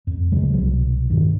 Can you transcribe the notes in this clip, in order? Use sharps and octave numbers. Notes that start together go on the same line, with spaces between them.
F2
D2 C#3 F#3 G#3
C2 B2 F#3
E1 G2 D#3